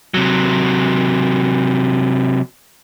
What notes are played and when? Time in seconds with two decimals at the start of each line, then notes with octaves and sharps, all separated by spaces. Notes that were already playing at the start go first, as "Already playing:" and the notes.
0.14 C3 F#3